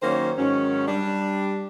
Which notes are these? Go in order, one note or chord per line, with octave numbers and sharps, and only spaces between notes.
D#3 F#3 A#3 C#4 D#4 C5
G#2 D#3 F#3 C#4
G3 D4